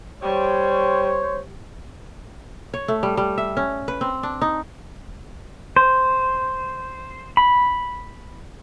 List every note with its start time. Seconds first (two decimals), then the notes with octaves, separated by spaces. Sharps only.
0.22 G3 C5 C#5
2.74 C#5
2.88 A3
3.03 G3
3.17 G3
3.38 E5
3.57 C#4
3.88 B4
4.01 C4
4.23 D4
4.41 D#4
5.76 C5
7.37 B5